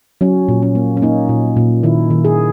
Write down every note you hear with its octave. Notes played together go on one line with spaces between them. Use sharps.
F#3 C#4
A#2
C#4
A#3
C#4
A#3 D#4
A#2
A#2
D#3 E4
D#3
G#4